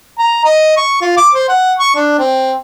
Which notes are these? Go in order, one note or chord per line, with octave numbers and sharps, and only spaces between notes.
A#5
D#5
C#6
F4
D6
C5
F#5
C#6
D4
C4